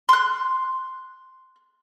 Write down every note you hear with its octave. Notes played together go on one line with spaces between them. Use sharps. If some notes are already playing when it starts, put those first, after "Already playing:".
C6 F#6